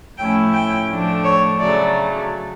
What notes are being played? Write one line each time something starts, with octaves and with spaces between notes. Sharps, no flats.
A2 F3 A3 C#4 E4 G5
G5
A2 F3 A3 D4
C#5
C#3 F#3 A3 D5